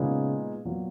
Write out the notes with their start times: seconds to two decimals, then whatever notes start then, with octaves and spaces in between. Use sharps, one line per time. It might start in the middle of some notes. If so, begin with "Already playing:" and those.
Already playing: A#2 C#3 G#3 B3 D#4
0.65 A#2 F#3 B3